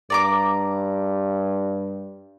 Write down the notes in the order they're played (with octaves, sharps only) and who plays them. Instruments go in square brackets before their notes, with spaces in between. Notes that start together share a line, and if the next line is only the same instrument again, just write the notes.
[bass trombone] G2 [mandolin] D5 A#5 D6